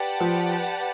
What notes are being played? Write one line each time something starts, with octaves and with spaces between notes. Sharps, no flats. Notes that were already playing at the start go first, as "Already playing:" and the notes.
Already playing: G4 B4 D5 F#5 A5
F3